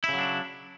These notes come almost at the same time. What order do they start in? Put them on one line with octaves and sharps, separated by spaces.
E4 C#3 F#3 D4